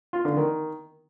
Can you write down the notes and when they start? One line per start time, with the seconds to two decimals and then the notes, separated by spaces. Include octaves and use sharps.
0.13 F4
0.25 D3
0.37 D#3